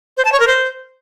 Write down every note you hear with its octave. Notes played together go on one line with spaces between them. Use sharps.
C5
A5
C#5
A#4
C5